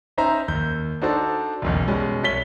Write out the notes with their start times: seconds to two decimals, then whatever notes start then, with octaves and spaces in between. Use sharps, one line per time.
0.18 C#4 D#4 C5 E5 A#5
0.48 D#2 G6
1.02 D4 D#4 F#4 A4 C5 A5
1.62 F#1 B1 E2
1.87 B2 G3 G#3 C#4
2.23 C2 C#5 B6 G7